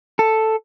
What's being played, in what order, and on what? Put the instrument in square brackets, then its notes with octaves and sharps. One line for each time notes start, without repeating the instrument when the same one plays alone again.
[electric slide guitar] A4